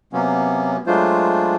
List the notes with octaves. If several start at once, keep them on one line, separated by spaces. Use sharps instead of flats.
C3 F#3 A#3 B3 C#4
F#3 G#3 A3 D4 F4 C5